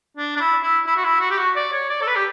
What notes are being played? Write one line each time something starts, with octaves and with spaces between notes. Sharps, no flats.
D4
D4
E4
E4
E4
F#4
E4
F#4
G4
F#4
D5
C#5
D5
A4
B4
G4